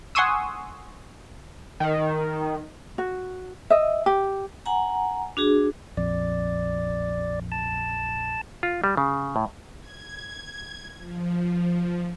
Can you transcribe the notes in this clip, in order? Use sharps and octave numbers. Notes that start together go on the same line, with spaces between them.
F#5 G#5 C6 C#6 D#6 E6
D#3
F#4
D#5 E5
G4
F#5 G#5 A#5
D4 F#4 G#4
A#1 F2 D5
A5
F4
G3
C#3
A2
G#6
F3